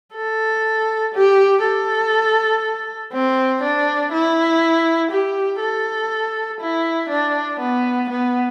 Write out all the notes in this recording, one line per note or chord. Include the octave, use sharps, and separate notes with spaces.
A4
G4
A4
C4
D4
E4
G4
A4
E4
D4
B3
B3